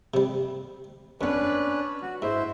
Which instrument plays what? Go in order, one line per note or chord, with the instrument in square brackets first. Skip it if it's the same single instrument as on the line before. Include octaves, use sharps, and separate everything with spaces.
[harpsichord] C3 G3
[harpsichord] F2 B3 [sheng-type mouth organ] C#4 D4 B4
[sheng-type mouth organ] F#4
[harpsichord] G#2 [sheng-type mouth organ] E4 C5 E5